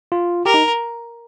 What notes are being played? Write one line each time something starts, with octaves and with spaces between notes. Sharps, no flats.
F4
G4 A#4
D#4